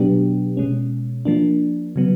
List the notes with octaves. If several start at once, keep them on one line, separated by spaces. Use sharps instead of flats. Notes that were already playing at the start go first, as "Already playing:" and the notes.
Already playing: B2 F#3 B3 D4 G4
B2 G#3 C#4
F3 A#3 D4
C#3 F#3 B3